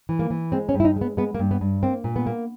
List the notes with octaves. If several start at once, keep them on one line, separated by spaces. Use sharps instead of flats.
E3
A#3
E3
G#3 C4
C#4
G2
E4
D#4
G#3
B3
G#3 B3
A#3
G2
B3
G2
A#3 C4
A#2
B3
A#3